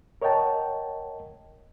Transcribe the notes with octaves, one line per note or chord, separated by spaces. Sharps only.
A#4 C#5 D#5 F#5 G5 A5